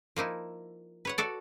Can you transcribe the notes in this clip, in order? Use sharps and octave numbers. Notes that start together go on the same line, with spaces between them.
F3 A#3 D#4 E4
B4 C#5 F#5
F#4 A4 D5